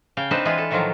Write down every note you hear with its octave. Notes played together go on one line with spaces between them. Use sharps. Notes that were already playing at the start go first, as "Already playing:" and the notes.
C#3 F5 G5
C4 D4 D#4 B4 C5 A5
E3 G#3 F4 G#4 B4
A4
A2 D#3 F3 F#3 F4